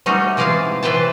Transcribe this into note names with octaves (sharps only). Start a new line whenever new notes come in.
G3 A3 C#4 D#4 F#4
C3 E3 G#3 F5 G#5 A5
C3 E3 B4 C5 G5 A5